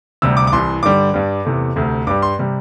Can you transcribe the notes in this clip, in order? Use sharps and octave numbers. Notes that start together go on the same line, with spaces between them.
D2 C3 G3 E6
D6
D6
C2 C3 E3 C6
G2 D3 G3 D6
G2 G3
E2 C3 A3
D2 C3 A3
G2 G3 D6
C6
C3 G3